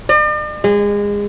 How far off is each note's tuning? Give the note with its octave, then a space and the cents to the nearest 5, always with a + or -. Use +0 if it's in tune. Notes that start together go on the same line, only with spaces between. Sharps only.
D5 +45
G#3 -25